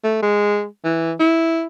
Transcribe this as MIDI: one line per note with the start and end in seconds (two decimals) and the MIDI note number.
0.04 0.21 57
0.22 0.65 56
0.84 1.14 52
1.19 1.67 64